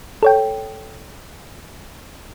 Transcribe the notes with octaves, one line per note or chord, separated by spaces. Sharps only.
A4 C#5 G5